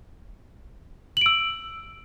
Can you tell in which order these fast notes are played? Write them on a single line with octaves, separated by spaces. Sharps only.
F#7 D7 E6